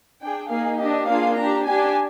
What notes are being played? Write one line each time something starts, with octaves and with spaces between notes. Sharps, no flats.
D4 G#4 G5
A#3 D#4 G#4 F5
D4 G4 D#5
A#3 D4 F4 G#4 F5
D4 G4 A#5
D4 G4 G#5